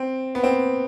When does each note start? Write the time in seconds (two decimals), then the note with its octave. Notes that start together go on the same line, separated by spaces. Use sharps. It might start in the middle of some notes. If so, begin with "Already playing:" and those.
Already playing: C4
0.35 B3
0.44 C4